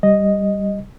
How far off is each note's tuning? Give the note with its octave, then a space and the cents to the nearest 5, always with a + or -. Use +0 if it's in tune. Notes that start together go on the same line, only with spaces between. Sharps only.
G3 +0 D#5 +0